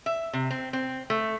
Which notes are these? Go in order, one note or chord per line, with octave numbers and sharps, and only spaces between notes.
E5
C3
C4
C4
A3